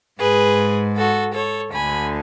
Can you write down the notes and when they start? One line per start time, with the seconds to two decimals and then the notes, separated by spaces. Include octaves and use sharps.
0.19 G#2 G#4 B4
0.96 F#4 A4
1.34 A4 C#5
1.72 D2 D3 G#5 B5